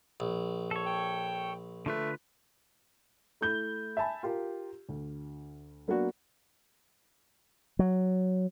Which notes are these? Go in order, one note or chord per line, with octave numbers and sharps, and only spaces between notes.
A#1
A4 C#5
G5
D3 A3 F4 B4
A3 E4 G6 G7
E5 G#5 A5 B5
F4 G4 A#4
D2
F#3 A#3 B3 D4 F#4
F#3